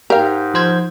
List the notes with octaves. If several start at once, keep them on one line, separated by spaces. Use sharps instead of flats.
G#2 G4 A#4 F5
F3 C5 G#6